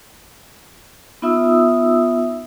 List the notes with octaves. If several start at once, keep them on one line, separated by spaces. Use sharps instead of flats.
B3 D#4 F4 E5 D#6 E6